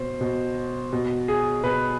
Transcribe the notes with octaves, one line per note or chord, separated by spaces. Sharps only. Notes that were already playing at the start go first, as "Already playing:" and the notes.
Already playing: B2 C5
B2
B2
G#4
B2 B4